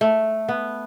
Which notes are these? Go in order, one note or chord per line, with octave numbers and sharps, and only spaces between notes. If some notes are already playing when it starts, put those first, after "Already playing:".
A3
B3